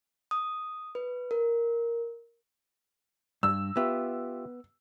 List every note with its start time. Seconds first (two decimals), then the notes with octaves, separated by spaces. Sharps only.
0.31 D#6
0.95 B4
1.31 A#4
3.43 G2 E6
3.77 B3 F4 G4 E5